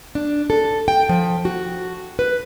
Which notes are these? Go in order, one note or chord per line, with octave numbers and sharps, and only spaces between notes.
D4
A4
G5
F3
F#4
B4